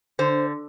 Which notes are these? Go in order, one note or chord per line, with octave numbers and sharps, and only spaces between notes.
D3 C5